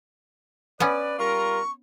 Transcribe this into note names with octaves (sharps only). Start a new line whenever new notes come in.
B3 C#4 B4 D5
G3 F4 A#4 C#6